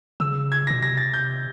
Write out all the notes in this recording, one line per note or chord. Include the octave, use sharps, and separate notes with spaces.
C#3 E6
G#6
A#6
B2
C3 A#6
A6
G6